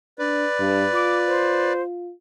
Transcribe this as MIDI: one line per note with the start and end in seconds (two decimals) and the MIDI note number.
0.19 0.45 62
0.19 1.73 71
0.19 1.73 74
0.60 0.85 43
0.94 2.11 65
0.94 1.15 86
1.27 1.82 72